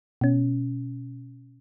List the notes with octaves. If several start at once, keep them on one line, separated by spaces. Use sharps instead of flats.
B2 C#4